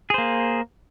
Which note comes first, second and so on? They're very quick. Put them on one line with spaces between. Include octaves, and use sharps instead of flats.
G#4 C5 A#3